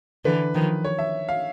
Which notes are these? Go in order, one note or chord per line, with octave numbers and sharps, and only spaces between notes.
D3 E3 B4
D#3 F3
C#5
E5
F5